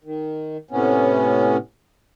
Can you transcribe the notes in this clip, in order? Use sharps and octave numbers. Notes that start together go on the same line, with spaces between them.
D#3
A2 C3 B3 C#4